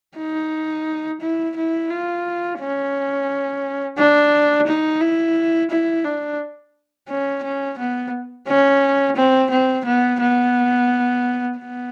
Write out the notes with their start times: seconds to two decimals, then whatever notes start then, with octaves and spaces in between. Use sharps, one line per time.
0.17 D#4
1.21 E4
1.56 E4
1.90 F4
2.60 C#4
3.98 D4
4.67 D#4
5.01 E4
5.71 E4
6.05 D4
7.08 C#4
7.43 C#4
7.78 B3
8.47 C#4
9.16 C4
9.51 C4
9.86 B3
10.20 B3
11.59 B3